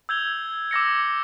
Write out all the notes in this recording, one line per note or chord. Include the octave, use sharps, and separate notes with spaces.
E6 G6 G#6 F7 G7
D6 E6 A#6 C#7